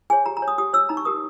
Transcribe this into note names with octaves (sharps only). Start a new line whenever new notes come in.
G#4 C#5 G#5
G4 A#5
A#5
C#5
D#6
G4 D#6
C#5 E6
D#4 A#5
C#6
G4 A#4 D#6